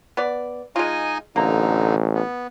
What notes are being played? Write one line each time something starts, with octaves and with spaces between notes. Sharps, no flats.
B3 D5
G#3 D#4 F4 D#5 G#5
A1 D3 A#3 D#4 A#5
B3